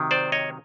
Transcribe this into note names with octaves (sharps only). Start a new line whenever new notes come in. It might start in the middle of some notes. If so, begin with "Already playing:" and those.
Already playing: C3 D#3 F#3
C5 D5
C#5 D#5